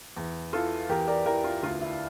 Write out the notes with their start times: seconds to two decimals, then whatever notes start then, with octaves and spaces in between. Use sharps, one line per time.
0.17 E2
0.53 E3 F4 A4
0.89 E2 G4 A#4
1.07 A#4 D5
1.26 E3 G4 A#4
1.44 F4
1.62 D2 F4
1.81 E4